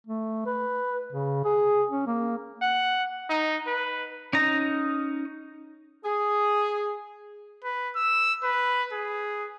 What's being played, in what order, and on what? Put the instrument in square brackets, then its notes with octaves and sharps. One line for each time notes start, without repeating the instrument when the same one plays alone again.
[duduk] A3
B4
C#3
G#4
C#4
A#3
[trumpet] F#5
D#4
B4
[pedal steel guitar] C#4 D#4 A#5
[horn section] G#4
[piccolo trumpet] B4
E6
B4
G#4